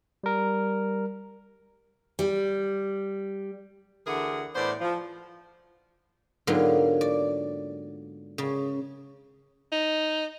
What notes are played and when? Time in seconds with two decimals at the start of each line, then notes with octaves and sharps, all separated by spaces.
0.24 G3 A#4
2.19 G3
4.07 D2 D3 E3 G#4 A#4 F#5
4.54 A2 E3 B3 C5 D5
4.81 F3
6.47 G#2 D3 F#3 A#3 B3 F4
7.01 D5
8.38 C#3
9.72 D#4